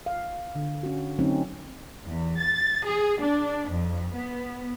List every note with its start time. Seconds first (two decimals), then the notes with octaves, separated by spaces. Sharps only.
0.06 F5
0.55 D3
0.83 C#4 F#4
1.19 D3 F#3 A3 C4 C#4 D#4
2.04 E2
2.39 A6
2.85 G#4
3.19 D4
3.69 F2
4.13 B3